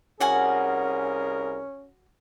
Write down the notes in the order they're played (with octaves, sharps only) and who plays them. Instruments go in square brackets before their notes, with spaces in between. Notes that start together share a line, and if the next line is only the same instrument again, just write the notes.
[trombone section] C2 G#4 A#4 [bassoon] C#4 [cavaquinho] F#4 F#5 G#5